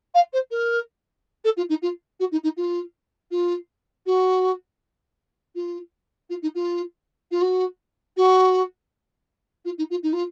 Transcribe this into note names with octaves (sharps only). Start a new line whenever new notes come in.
F5
C5
A#4
A4
F4
D#4
F4
F#4
D#4
D#4
F4
F4
F#4
F4
F4
D#4
F4
F4
F#4
F#4
F4
D#4
F4
D#4
F4